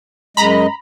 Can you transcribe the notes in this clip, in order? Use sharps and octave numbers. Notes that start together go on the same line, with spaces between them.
F#2 G#3 D#5 A#5 B5